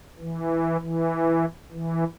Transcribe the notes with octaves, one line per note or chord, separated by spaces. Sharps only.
E3
E3
E3